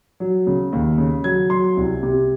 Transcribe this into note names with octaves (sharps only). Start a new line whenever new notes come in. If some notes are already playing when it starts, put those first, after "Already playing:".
F#3
C#3
D#2
C#3
F#3 G#6
F#3 C6
C2
C3